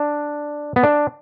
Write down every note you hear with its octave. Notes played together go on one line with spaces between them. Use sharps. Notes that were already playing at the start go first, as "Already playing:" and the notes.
Already playing: D4
B3
D4